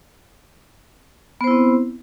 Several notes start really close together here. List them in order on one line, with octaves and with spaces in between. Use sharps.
B3 C5 E4 C4